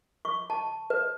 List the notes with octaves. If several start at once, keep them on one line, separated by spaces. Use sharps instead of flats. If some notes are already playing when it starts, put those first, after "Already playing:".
C#6
A5
B4